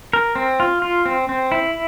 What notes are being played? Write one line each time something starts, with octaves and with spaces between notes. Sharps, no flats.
A#4
C4
F4
F4
C4
C4
E4